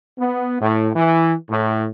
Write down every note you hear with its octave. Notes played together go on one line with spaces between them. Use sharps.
B3
A2
E3
A2